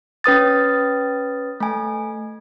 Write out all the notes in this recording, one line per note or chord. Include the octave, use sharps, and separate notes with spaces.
C#4 B4 D#6 A6
A3 G#5